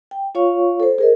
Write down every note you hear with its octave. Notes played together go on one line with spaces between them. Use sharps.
G5
F4 C#5 F5 C#6
A4 C5
G#4 A#4 D#5